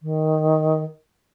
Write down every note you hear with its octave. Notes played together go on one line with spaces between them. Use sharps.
D#3